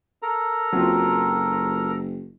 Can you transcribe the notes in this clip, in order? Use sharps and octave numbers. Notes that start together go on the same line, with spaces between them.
A4 A#4 A#5
F#1 F#3 C4 F4